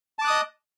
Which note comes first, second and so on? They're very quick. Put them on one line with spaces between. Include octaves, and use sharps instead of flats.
A5 D6 F#6 D#6 D#5